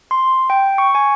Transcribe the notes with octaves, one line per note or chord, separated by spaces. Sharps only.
C6
G5
C#6
G#5